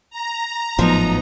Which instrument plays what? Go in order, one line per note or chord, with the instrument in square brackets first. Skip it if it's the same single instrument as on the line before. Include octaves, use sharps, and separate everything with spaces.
[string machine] A#5
[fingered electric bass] G#1 A2 F#3 [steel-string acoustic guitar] F3 [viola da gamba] B3 D#4